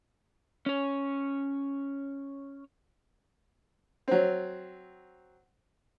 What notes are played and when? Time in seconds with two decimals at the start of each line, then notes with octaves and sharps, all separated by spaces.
0.66 C#4 C#5
4.08 F#3 C4